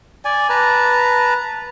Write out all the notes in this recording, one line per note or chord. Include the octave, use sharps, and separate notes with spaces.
D5 G#5
B4 A5 A#5